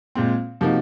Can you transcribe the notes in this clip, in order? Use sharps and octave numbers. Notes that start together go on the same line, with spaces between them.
A#2 G#3 C4
C3 F3 A#3 D#4 F#4